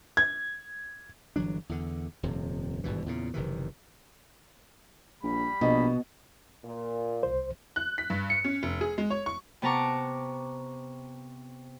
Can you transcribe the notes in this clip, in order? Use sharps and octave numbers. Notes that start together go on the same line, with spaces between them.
G#6
G1 E3 F#3 D4
E2 D3
D#1 F2 C3
G#1 G2 B2 E3
E2 A#2 C#3
F#1 C3 D#3 E3
A#1 G3 B5
A#1 B2 D#5
A#2
C2 C5
F#6
B6
G2
C#7
C#4
F1
G#4
G#3
C#5
C#6
C3 B3 A5 A#5 C#6 D6